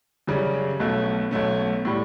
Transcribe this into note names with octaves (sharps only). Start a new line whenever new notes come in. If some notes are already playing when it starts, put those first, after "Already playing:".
F#2 C#3 G3 C#4
B1 B2 A3 C#4
B1 B2 A3 C#4
A2 G3